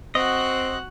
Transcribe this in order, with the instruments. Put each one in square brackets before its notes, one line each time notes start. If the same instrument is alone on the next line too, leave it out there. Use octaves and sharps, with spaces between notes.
[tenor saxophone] C4 [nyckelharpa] F#4 F#5 [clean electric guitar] D#5